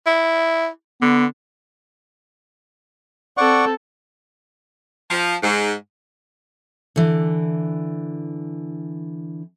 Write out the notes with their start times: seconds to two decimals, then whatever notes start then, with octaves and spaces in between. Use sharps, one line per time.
0.06 E4
1.02 D3 B3
3.37 C4 A4 D5 F#5 C#6
5.10 F3
5.42 G#2
6.96 D3 E3